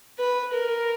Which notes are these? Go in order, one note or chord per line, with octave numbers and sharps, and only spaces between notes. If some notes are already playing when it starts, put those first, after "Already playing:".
B4
A#4